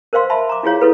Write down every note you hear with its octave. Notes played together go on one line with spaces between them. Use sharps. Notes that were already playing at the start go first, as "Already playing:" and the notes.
A#4 C5 D#5 F5 C6
E5 A5 B5 C6
A#5 D6
E4 F4 G#4 C#5 F5
E4 A4 B4 F5